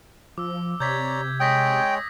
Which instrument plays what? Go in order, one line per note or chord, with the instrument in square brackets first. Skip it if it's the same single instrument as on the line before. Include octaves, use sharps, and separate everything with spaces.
[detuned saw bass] F3 [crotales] D6 E6
[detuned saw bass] C3 [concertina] C#5 D5 A#5 [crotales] G6 G#6 B6
[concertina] G#3 C#5 [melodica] G5 [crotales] D#6 A#6 B6